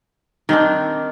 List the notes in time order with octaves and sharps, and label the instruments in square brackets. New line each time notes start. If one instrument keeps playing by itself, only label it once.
[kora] D#3 C4 D4